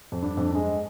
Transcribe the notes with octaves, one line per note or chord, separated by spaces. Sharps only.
F2
G2 D4
F2
G2 G#3